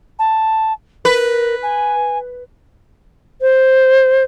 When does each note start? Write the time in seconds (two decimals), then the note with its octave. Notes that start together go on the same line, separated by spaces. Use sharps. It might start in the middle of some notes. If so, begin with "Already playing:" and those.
0.19 A5
1.05 A#4 B4
1.62 G#5
3.41 C5